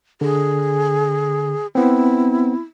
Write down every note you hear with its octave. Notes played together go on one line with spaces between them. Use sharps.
D3 G#4
B3 C4 E4